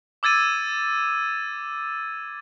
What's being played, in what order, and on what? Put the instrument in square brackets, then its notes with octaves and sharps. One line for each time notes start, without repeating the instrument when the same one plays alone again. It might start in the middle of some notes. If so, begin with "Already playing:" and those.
[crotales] D6 E6 G#6 A6 D#7